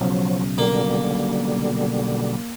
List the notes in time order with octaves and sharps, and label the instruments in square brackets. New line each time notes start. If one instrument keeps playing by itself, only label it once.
[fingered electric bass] B1 C#3 [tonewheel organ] F3 F#3
[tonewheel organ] B2 D3 G3 [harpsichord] A#3